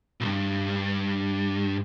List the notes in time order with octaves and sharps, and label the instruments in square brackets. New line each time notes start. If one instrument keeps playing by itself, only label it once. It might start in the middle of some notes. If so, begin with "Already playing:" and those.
[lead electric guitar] B1 G2